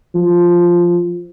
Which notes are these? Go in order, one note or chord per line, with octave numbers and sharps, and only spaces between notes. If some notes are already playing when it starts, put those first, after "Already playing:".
F3